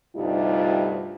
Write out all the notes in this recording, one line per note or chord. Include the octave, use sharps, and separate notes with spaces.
D2 G2 C3 G3 D#4 F4